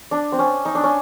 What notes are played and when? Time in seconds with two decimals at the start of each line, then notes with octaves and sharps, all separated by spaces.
0.11 D4
0.32 C4
0.39 C#4
0.65 D#4
0.75 D4
0.84 C#4